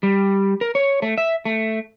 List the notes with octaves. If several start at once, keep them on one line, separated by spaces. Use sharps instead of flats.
G3
A#4
C#5
A3
E5
A3